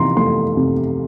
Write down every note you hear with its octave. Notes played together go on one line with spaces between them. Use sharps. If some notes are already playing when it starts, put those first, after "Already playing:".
Already playing: C3 E3 A#5 C6
A3 C6
C3